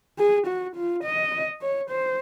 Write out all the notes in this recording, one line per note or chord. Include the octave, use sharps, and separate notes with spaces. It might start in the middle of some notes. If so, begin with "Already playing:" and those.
G#4
F#4
F4
D#5
C#5
C5